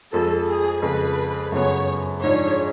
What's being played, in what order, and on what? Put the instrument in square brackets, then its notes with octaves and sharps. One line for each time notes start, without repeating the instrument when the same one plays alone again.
[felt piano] F2 F3 G#3 [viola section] A4
[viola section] G#4
[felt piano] F2 C#3 G#3 [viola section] B4
[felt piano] F#2 C#3 G#3 B3 [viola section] C#5
[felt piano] G#2 F3 G#3 D4 [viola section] C#5